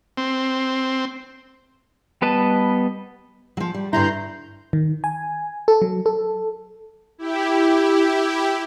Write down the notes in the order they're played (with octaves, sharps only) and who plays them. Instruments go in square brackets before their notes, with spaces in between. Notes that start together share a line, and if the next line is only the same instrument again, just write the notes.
[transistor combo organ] C4
[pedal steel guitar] G3 B3 B4 D#5 A5
[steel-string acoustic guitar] F3 F#3
G3
[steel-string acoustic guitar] G2 D3 E4 [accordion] A#5 C6 G6
[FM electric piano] D#3
G#5
A4
F#3
A4
[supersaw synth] E4 G4